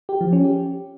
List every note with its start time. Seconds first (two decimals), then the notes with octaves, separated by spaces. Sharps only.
0.09 G4
0.21 F3
0.33 C#4
0.44 G4